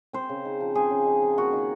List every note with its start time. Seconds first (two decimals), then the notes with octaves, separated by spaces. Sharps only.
0.13 C4 C5
0.29 C#3
0.45 D#4
0.60 F3
0.75 C4 G#4
0.91 C#3
1.07 D#4
1.22 F3
1.38 A#3 F#4
1.53 D#3